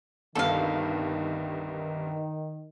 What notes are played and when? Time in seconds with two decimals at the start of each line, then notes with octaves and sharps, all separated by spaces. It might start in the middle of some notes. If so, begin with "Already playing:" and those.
0.35 G1 C2 G2 D#3 A4 F5